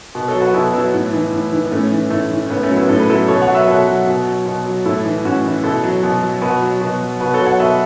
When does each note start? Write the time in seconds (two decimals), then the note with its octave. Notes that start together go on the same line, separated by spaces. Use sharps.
0.15 B2
0.28 A4 C#5
0.35 F#3
0.41 F#4 B4
0.54 B2 E4 A4
0.74 F#3 B3 E4
0.94 A2
1.13 E3
1.32 A2
1.52 E3
1.65 B3
1.71 A2 A3 C#4
1.91 E3
2.10 A2 A3
2.31 E3
2.46 C#4
2.50 A2 B3
2.63 A3 C#4
2.70 F#3
2.76 B3 E4
2.89 A2 A4
3.00 B4
3.09 F#3 E4 A4
3.28 B2 A4 C#5
3.42 C#5 F#5
3.48 F#3
3.54 B4 E5
3.68 B2 A4 C#5
3.87 F#3
4.07 B2
4.27 F#3
4.46 B2
4.66 F#3
4.85 A2 E4 A4
5.05 E3
5.24 A2 C#4 F#4
5.44 E3
5.64 B2 E4 A4
5.83 F#3
6.03 B2
6.23 F#3
6.42 B2 F#4 B4
6.62 F#3
6.81 B2
7.01 F#3
7.20 B2 F#4 B4
7.34 A4 C#5
7.41 F#3
7.46 C#5 F#5
7.60 B2 B4 E5